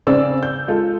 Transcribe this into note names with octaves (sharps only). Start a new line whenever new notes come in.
C#3 C4 G#4 D5 E6
G6
G#3 F4 A4